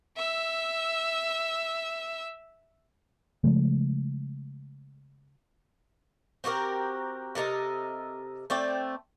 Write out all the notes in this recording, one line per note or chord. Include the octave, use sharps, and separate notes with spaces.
E5 E6
C#3 F3 G#3 A3
C4 F#4 G4 A#4
C3 A4 A#4 D#5
A3 C4 D5 G5